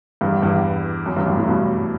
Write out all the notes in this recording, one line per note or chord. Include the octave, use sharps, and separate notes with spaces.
E2 G2
E2 G2
F#2
E2 G2
F#2 A2
F#2 A2
G2 B2